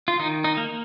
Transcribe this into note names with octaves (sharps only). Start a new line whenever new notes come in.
F4
D#3 D#4
D#4
A#3